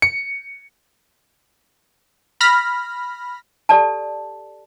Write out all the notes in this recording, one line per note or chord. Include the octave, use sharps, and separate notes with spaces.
C#7
B5 F6 A#6 B6
G4 A4 D5 A5